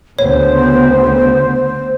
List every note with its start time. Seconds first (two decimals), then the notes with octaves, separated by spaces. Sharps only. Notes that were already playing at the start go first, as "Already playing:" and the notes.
0.19 D2 C#3 B3 C5 C#5